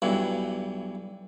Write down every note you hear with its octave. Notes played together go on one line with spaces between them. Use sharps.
B1 G2 E3